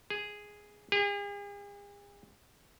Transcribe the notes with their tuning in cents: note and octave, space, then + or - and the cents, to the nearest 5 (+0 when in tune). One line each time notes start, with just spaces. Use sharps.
G#4 -5
G#4 -45